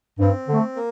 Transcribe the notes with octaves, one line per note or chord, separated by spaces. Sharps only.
G2 C4
D3 A3
A#3